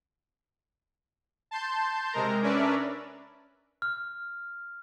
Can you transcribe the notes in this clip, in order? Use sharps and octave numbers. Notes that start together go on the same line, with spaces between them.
A5 C6 G6
C3 G#3 A#4 A#5
C#4 D4 A#4 B4 D5 E5
F6